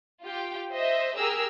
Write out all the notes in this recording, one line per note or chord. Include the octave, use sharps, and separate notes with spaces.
F4 G4 G5
C5 D#5 E5
G4 G#4 A#4 E6